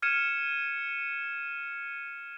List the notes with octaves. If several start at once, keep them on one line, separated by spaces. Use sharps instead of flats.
F6 G#6 C#7 D#7 E7